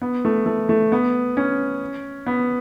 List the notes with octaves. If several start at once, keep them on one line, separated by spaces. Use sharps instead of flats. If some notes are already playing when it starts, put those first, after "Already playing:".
B3
A3
A3
A3
B3
C#4
B3